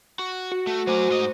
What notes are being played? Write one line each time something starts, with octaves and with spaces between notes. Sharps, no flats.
F#4
F#4
A3
F#3 A3 C5 G#5
G#2 D#5